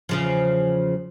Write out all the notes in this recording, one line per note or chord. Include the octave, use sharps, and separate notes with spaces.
E2 C#3 F3